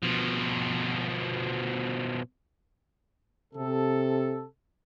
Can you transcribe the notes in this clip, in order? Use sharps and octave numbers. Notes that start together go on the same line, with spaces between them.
B2 F3
C3 A4